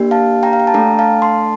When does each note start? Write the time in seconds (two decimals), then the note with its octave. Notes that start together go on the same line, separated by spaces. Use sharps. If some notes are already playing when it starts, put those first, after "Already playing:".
Already playing: A#3 D4 G4
0.11 F5 A5
0.43 G5 A#5
0.53 F5
0.60 G5
0.67 A5
0.74 A3 D4 A4 G5 A#5
0.99 F5 A5
1.22 A5 C6